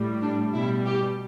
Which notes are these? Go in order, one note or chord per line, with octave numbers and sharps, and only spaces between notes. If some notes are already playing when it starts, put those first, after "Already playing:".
Already playing: A2 G3
D4
B2 G3 E4
G4